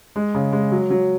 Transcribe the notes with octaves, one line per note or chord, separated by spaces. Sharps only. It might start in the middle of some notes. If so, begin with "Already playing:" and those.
G#3
C#3
G#3
F#3
F#3